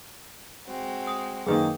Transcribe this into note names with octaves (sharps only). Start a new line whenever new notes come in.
G#3 C4 F#4
D#6
F#2 D#3 A#3 G#4 B4 G5 A6